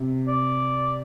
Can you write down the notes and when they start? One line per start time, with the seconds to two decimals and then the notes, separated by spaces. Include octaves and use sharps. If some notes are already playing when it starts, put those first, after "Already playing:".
Already playing: C3
0.28 D5